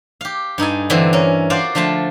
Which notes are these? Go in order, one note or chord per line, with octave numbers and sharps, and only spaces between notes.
G4 F5
G2 D#4 A4 G#5
D3 E3 C4
C#4 A#4
F4 F#4 C5 D5 F5
D3 F3 A3 F4 A5